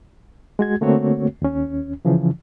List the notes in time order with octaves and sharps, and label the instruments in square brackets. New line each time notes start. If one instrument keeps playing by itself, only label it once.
[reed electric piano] G#3 F#4 G#6
D3 A3 A#3 C4 F#4 C#5
D#2 C#4
C#3 E3 F3